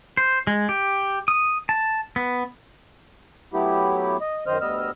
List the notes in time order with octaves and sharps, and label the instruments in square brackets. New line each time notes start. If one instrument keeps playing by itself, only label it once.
[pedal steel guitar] C5
G#3
G4
D#6
A5
B3
[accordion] F#3 A3 B3 E4 G4
D#5
F#2 D#3 C5 D#5 F6
D2 G3 B3 D#5 E6 F6